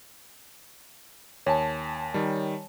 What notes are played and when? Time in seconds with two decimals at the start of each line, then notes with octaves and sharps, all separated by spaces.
1.46 D#2 C#5 G#5 A5
2.14 D#3 G3